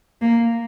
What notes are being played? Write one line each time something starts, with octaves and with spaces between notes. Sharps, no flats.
A#3